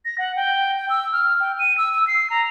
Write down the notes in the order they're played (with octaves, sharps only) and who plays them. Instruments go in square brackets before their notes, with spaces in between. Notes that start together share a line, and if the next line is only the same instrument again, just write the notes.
[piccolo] A#6
F#5
G5
G5
E6
F6
G5
D#7
E6
E6
C7
A#5